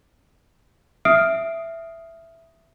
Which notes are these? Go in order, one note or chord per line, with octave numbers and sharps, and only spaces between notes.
E5 D#6 F6 C7 D7